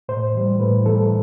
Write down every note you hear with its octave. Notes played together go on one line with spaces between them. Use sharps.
A2 C5
E3 G3
A2 B4
E3 G3 A4